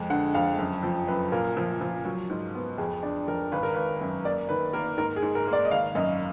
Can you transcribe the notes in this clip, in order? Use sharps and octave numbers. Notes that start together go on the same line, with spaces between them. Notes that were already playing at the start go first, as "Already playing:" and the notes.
Already playing: F2 G#3
D3 F#5
F2 F5
F#2
F3
F#2 B4
A#2 A#4
F3
F3
F#3
G#2
B3
F2 G#4
D4
F2 A#4
G#1 B4
A#4
G#1 B4
F#2
A#3 D5
D#3 B4
A#3 A#4
G#2 A#4
G#4
G#2
A#4
A#3
D5
D#5
G#1 F5
F#2 D#5